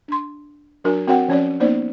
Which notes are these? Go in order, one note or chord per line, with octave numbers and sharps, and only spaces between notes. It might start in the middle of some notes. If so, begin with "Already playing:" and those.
D4 C6
F#3 D4 F#4 A#4 G#5
C4 F#4 A#4 C#5 F#5 G5
F3 C#4 C#5 D5
A#3 B3 D#4 C5 D5